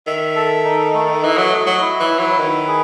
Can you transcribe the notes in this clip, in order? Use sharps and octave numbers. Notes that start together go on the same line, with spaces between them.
D#3 E5
A4
D#4
A3
E3 D#5
F#3
D#5
F#3
E4
E3
E4
F#3
D#3 B4
G#4